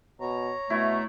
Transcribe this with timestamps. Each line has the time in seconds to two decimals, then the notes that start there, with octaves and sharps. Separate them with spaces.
0.20 B2 C#5 A#5
0.70 B2 A3 E4